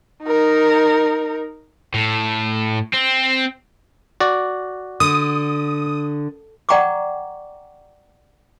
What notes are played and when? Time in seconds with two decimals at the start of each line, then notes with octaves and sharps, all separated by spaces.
0.23 D#4 A#4
1.94 A2
2.94 C4
4.20 F#4 D5
5.00 D3 D#6
6.69 D5 F#5 G5 A#5 C#6 D6